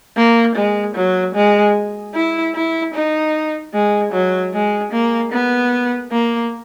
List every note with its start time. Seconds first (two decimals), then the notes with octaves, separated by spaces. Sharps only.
0.17 A#3
0.56 G#3
0.96 F#3
1.35 G#3
2.14 E4
2.55 E4
2.94 D#4
3.73 G#3
4.12 F#3
4.53 G#3
4.92 A#3
5.32 B3
6.12 A#3